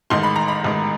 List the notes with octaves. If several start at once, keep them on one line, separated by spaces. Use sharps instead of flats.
A1 G#2 D#3 C6
B5
A#5
B5
A1 G#2 D#3